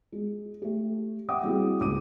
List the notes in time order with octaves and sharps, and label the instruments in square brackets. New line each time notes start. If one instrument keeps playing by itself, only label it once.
[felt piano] G#3
A3 G4
E5 F#5 G5 D6 D#6
G3 A#3 C4 E4 F#4 G#4
C#2 D6 D#7